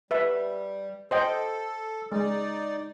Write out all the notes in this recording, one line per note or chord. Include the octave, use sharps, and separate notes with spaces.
G3 B4 E5
A4 C5 D#5 G5
G#3 D#4 D5